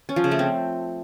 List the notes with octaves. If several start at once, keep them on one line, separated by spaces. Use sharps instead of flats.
C#4
F3
C#3
A3
C4